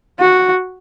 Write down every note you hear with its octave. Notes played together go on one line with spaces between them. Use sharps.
F#4